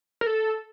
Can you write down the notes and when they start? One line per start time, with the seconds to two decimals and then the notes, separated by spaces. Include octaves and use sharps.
0.21 A#4
0.27 A4